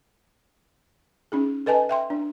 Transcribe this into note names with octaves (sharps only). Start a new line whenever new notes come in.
C#4 D#4 G#4
A4 B4 D#5 G#5 A5
E5 G5 C6
D4